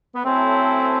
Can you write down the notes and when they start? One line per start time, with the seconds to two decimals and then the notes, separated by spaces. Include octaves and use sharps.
0.15 B3
0.24 F#3 A3 C4 C#4 E4 A4